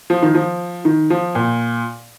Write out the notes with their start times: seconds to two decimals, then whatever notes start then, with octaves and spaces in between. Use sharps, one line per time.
0.10 F3
0.22 D#3
0.34 F3
0.85 D#3
1.10 F3
1.35 A#2